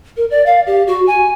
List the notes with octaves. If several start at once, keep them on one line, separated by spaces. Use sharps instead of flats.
A#4
D5
F5
G4
F#4
G#5